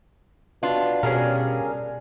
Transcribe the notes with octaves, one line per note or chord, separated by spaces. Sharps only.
B2 D4 F4
B2 G3 C#4 G#4 A#4